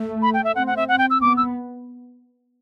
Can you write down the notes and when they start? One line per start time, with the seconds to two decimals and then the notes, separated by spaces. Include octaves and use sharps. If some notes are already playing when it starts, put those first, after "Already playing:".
Already playing: A3
0.22 B5
0.34 G5
0.44 E5
0.55 C4 F#5
0.67 F#5
0.77 E5
0.88 F#5
0.98 G5
1.10 E6
1.21 B3 D6
1.37 E6